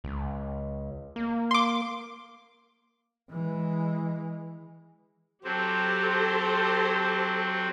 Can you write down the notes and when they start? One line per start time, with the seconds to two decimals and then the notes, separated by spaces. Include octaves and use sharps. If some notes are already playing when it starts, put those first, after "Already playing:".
0.04 C#2
1.16 A#3
1.51 C6 D6
3.30 E3 G#3
5.44 F#3 C4 G4 A4 C5